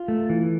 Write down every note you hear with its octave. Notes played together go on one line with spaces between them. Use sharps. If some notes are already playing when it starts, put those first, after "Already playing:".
Already playing: F4
A3
E3